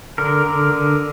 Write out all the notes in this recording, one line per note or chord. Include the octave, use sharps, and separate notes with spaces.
D3 A#4
D3
D3